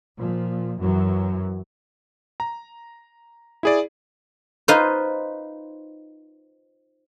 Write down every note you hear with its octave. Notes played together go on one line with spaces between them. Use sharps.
A#2 F3
F#2 E3 F#3
A#5
E4 G#4 D5
D#4 F4 B4 C5